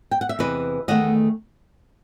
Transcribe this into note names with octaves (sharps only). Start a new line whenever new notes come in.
G5
F#5
E5
E2 C3 E3 B4 D#5
E2 D#3 A3 D#5 F#5